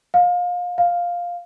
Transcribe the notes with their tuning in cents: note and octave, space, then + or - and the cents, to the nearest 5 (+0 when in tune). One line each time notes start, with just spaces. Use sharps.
F5 +30
F5 +5